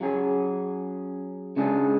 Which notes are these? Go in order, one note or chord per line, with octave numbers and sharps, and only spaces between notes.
F#3 C#4 G#4
C#3 G#3 D4 G#4